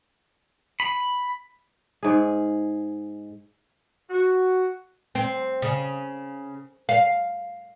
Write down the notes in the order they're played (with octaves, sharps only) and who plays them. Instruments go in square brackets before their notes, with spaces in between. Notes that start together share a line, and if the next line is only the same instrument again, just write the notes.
[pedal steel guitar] B5
[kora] G#2 G#4
[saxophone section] F#4
[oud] C4
C#3
F5